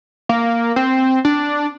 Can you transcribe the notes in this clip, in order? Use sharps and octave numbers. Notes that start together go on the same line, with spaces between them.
A#3
C4
D4